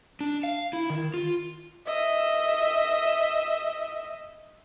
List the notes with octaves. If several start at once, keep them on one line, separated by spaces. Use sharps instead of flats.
D4
F5
E4
D#3
F4
D#5 E5